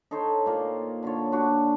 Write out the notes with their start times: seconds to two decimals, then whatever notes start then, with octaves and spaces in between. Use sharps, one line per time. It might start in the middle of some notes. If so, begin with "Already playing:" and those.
0.11 D#4 A4 C5 C#5
0.46 A#2 A#3
1.03 D3 F4 C#5
1.32 D4 F#4